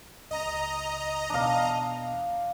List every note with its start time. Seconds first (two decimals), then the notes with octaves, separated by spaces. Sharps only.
0.31 C#2 C#3 D#5 A#5
1.30 E2 B2 D4 F5